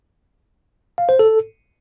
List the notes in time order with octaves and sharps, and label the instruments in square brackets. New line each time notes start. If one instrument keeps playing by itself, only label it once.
[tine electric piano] F5
C5
A4